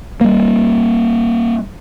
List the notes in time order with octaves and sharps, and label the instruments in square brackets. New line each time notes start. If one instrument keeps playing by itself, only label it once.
[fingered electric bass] G3 A#3